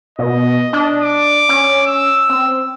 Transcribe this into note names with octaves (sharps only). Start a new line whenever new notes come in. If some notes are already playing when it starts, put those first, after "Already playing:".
B2 D#5
D4
D6
C#4
E6
C4